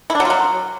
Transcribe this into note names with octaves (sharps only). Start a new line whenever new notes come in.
E4
D4
F#3
F4
F#3